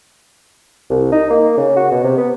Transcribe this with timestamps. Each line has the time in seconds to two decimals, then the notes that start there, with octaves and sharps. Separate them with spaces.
0.90 C2
1.12 D#4
1.30 A#3
1.57 C#3
1.76 F#4
1.91 B2
2.04 C3
2.17 B3